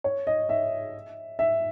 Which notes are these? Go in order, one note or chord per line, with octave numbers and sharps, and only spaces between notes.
C#5
D#5
E5
E5